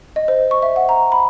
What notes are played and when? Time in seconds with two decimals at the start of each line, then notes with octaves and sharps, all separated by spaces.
0.16 D#5
0.28 C5
0.51 C#6
0.62 E5
0.76 F#5
0.89 A#5
1.12 B5